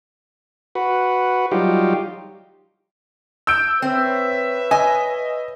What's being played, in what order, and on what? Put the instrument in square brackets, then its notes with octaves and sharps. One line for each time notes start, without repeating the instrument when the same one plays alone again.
[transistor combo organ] F#4 B4
F#3 G3 D#4 F4 G4
[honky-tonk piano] E6 G6 D7
[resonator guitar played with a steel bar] C4 [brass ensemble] B4 C#5 E5
[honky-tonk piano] D#5 [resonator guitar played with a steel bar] G#5